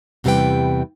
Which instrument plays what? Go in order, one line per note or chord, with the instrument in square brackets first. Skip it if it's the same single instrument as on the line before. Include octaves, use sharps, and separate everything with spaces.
[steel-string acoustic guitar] E2 C3 G3 E4 B4 G5